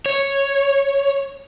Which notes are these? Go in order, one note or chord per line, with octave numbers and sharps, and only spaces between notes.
C#5